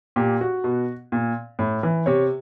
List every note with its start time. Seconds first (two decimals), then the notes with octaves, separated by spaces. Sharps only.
0.16 A#2 G4
0.41 F#4
0.64 B2
1.12 A#2
1.59 A2
1.83 E3
2.06 C3 C#5